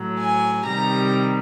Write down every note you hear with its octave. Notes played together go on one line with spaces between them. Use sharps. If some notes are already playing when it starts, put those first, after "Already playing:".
Already playing: A2 F#3
G#5
C3 D#3 G3 A#5